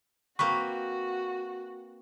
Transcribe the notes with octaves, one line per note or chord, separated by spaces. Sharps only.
A#3 C4 F#4 B4 C#6